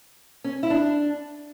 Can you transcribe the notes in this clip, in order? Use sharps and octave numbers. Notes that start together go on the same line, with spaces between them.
C#4
E4
D4